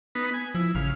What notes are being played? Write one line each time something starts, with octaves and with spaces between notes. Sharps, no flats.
B3 D#4 B4
G#5
F3 E4
A1 C#3 F5